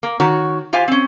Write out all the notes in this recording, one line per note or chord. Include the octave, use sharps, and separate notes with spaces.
A#3
D#3 F#4 C#5
F4 G4 C5 F5 G#5
C4 C#4